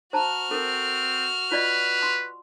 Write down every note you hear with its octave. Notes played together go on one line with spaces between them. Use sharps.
F#4 C5 A5 A#5 F6
C4 A4 A#4
F4 B4 D5 D#5
C6